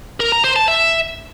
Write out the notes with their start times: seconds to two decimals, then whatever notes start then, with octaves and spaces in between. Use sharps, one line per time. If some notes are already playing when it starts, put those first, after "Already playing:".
0.20 A#4
0.32 A#5
0.44 C5
0.56 A5
0.68 E5